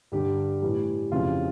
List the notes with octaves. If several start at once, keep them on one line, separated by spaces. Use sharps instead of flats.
G2 D3 G3 G4
A2 E3 G3
F2 C#3 E3 G3 F4